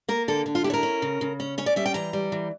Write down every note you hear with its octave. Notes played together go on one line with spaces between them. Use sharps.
A#3 A#4
D3 A4
D3
F4
E4 G4
C#5
A#4
C#4
C#3
C#3
C#4
C#4 C#5
D5
G3 E5
G5
E3 A#5
G3
E3